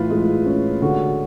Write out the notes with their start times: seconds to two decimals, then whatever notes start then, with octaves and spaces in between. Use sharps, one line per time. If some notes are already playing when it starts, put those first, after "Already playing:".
Already playing: A2 E3 F4 B4
0.10 G#3
0.46 C#4
0.82 D3 F#4